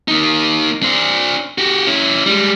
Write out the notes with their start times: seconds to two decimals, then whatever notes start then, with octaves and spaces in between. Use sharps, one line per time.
0.08 A#3 D#4
0.83 D4 C5
1.58 F#4 G4
1.87 C#4 E4
2.26 G3 G#3